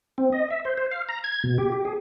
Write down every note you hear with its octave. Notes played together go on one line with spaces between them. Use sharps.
C4
D#5
E5
C5
C5
F5
A#5
G#6
B2
G4
G4
G#4